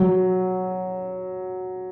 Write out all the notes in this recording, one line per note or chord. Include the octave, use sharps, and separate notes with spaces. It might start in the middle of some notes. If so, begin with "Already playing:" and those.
Already playing: F#3